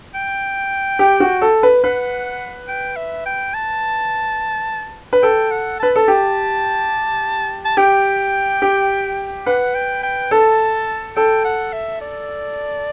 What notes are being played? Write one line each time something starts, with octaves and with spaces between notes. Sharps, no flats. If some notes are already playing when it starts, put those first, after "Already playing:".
G5
G4
F#4
A4
B4
B4 F#5
G5
E5
G5
A5
B4
A4 G5
F#5
B4 A5
A4 A5
G4
A5
G4 G5
G4
B4 F#5
G5
G5
A4 A5
A4 G5
F#5
E5
D5